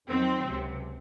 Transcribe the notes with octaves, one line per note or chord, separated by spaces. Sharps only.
F2 D#3 F#3 C4
C#2 C3 F#3